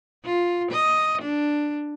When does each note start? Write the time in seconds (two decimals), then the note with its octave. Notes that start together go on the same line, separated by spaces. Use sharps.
0.25 F4
0.71 D#5
1.22 D4